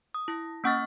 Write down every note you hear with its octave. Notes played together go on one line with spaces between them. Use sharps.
D#6
E4 A#6
A#3 C#4 F#5 C#6 F6 A6